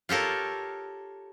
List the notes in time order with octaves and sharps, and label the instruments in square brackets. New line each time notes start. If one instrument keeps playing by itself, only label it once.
[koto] F4 G4 A4 A#4 C#5